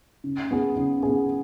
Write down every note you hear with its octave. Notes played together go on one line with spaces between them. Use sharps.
C#3
B3 G#4
C#3
B3 G#4